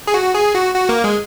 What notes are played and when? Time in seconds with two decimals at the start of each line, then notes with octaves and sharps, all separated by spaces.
0.07 G#4
0.14 F#4
0.34 G#4
0.54 F#4
0.74 F#4
0.89 A#3
1.04 G#3